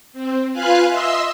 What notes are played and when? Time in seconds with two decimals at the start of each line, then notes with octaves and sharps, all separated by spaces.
0.13 C4
0.52 F4 B4 F5 G#5 F#6
0.90 D#5 E5 C6 E6